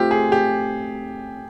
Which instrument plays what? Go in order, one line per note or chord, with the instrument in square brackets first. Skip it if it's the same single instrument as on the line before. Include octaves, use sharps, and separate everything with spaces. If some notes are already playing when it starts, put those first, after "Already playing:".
Already playing: [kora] A3 C4 F4 [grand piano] G4
[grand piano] G#4
G4